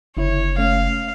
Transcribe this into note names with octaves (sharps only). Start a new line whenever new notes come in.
F#1 D3 E4 C#5
A3 C#4 F5